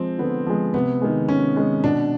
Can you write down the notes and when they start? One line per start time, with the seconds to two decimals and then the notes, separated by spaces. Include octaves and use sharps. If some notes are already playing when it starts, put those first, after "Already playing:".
Already playing: F3 G#3 C4
0.19 D3 B3
0.46 F3 G#3
0.74 C3 B3
1.01 D#3 G#3
1.28 C3 C#4
1.56 D#3 G#3
1.83 B2 D4